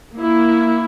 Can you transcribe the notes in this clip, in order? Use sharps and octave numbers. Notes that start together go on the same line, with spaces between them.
A#3 E4